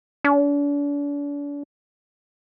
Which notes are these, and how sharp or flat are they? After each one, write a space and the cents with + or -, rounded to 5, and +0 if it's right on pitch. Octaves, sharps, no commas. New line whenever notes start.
D4 -40